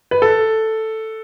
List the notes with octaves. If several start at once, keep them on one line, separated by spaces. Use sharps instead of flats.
B4
A4